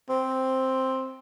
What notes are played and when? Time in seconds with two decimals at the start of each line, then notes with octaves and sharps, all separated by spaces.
0.09 C4